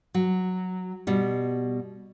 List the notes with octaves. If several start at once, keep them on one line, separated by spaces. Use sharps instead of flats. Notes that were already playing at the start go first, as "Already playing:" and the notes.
F#3
B2 G3